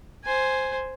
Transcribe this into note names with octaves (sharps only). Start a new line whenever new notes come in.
C5 G#5